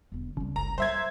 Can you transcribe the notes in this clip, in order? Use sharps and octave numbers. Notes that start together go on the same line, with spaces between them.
E1 D3
C2 C#3 G3
F#1 A#5
F3 G3 C5 E5 G#6